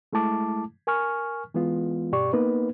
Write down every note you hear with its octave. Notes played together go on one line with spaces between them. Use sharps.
G#3 A3 E4 A5 D6
A#4 G#5 C#6 F6
E3 G#3 B3 F4
G2 B2 G4 D5 C#6
A#3 B3 D#4 B4